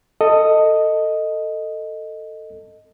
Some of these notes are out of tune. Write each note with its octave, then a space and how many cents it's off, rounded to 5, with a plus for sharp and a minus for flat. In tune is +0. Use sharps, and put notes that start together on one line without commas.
A4 +20 D#5 +0